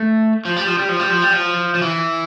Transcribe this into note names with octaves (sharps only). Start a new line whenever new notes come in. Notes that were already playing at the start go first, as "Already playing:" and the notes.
Already playing: A3
F3
G3
F3
G3
F3
G3
F3
G3
F3
F3
E3